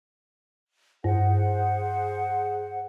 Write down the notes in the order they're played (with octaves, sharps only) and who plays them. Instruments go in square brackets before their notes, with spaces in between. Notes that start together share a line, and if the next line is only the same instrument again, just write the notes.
[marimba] G2 [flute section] G#4 C5 F#5